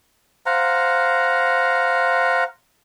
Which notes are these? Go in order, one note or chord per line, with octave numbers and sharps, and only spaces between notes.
C5 F5 F#5 A#5